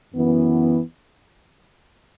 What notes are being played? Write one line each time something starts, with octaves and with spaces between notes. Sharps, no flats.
F#2 E3 B3